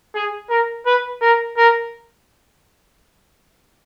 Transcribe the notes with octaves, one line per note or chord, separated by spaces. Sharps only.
G#4
A#4
B4
A#4
A#4